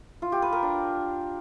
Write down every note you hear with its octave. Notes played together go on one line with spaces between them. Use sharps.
F4
G4
B4
A#4
D4